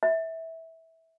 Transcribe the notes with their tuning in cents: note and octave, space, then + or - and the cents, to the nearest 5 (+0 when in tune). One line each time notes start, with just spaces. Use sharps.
E5 -20